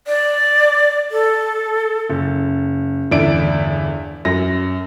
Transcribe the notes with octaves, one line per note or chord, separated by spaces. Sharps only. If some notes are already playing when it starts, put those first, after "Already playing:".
D5
A4
F#1
G1 E2 A2 D4 E5 D7
F#2 A#6